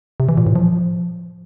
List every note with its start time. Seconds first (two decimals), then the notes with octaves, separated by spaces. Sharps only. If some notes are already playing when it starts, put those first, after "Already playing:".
0.20 C3
0.29 E3
0.38 A#2
0.47 A2
0.56 F3